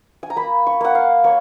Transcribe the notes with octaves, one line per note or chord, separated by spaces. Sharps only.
G#5
A#5
A#3 B5
C#6
A#3 F#5
F5
A#3 C#5